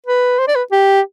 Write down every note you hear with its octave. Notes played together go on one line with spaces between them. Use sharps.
B4
C5
D5
B4
G4